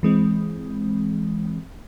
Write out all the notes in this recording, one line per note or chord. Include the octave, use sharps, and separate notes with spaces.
E3 G#3 C4